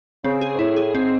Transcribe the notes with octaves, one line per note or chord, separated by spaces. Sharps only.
C#3 C4
G#4
G#2
A2 E4
G#4
G#2 C4